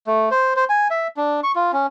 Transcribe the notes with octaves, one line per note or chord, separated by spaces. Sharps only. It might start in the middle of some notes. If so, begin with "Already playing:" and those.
A3
C5
C5
G#5
E5
D4
C#6
F4
C#4